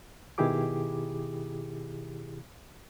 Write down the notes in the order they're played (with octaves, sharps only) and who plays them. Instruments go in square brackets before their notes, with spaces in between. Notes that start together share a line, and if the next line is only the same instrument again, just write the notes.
[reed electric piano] B2 D#3 E4 G4 G#4 D6